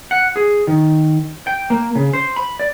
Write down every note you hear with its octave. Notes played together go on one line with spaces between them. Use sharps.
F#5
G#4
D#3
G5
A#3
C#3
C5
B5
D5